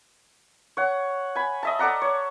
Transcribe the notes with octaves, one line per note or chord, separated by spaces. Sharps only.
C#5 F#5
G#5 B5
D#5 E5 A5
A4 D5 F#5 A#5
C#5